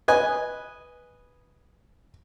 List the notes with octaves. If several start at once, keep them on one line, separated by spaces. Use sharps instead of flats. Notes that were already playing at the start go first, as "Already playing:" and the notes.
B4 D#5 G#5